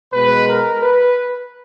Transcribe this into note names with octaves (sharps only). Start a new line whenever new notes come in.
B2 G#3 B4
A#4
B4